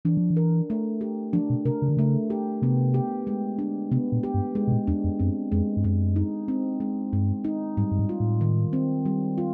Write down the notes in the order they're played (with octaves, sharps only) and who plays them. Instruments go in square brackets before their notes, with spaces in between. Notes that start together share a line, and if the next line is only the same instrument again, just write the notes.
[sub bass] E3 [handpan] D4
[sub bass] F3
E3
[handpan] A#4
A3
G4
[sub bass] F3 [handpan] D4
[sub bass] B2
[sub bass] C3 [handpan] A#4
[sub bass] C#3
D3
[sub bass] C#3 [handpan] A3
[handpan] G4
[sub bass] C3 [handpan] B3
[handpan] G4
G#3
D4
[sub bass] C3 [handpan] B3
[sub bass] A#2
[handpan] G4
[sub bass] G2
[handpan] G#3
[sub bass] B2
A#2
[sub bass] E2 [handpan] D4
[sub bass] F2
[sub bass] F#2 [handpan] C4
[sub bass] F2 [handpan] G#3
[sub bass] G2
[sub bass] F#2 [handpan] G#3
[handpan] D#4
C4
G#3
[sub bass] G2 [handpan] G#3
[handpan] D#4
[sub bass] G#2 [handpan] G3
[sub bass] G2
G#2
[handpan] F4
[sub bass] A2
[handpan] D#3
C4
G3
F4